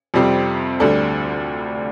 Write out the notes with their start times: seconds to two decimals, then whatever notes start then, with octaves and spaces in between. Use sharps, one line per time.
0.14 F2 C3 G3 C4
0.80 D2 D3 G3 D4 A4